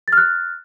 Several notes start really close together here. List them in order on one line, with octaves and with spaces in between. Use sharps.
A6 F6 F#6